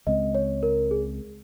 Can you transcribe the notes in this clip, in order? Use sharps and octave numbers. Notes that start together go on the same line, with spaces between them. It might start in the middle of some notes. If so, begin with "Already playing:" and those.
C#2 C#3 G#3 C4 D#5
C#5
A#4
G#4